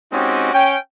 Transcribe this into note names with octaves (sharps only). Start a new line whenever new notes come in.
G#3 C4 C#4 D#4 F#4 G4
C#4 G5